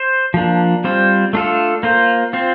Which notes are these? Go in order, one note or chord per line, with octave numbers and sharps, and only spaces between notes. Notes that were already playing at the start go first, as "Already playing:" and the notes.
Already playing: C5
F3 A#3 D4
G3 C4 F4 C5
A3 D4 F4 A4
A#3 F4 C5
C4 F4 C5